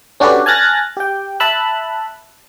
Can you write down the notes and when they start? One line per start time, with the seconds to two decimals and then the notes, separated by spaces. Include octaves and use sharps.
0.20 C#4 D4 F#4 G4 A4 B4
0.46 G#5 A5 F6 F#6 A6 A#6
0.97 G4 G5
1.40 E5 A5 B5 E6 F#6